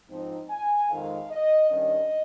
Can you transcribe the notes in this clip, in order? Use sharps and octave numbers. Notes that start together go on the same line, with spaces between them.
G#2 F3 C4 D#4
G#5
F2 D#3 G#3 F5
D#5
G2 D#3 G3 C#4 D#5